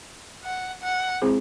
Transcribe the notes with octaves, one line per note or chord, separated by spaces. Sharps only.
F#5
F#5
G#3 C4 E4 G#4 C5